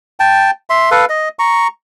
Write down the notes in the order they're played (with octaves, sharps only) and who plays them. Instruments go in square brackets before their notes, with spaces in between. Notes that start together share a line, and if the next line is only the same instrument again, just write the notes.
[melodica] G5 A5
E5 C6
A4 B4 F5
D#5
A#5 C#6